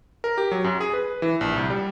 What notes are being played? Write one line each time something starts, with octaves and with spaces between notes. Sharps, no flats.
A#4
G4
F#3
F#2
G#4
B4
E3
A#1
C2
G3